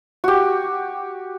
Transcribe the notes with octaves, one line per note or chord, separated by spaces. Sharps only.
F#4 G4